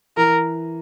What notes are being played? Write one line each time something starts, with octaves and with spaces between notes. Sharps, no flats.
E3 A#4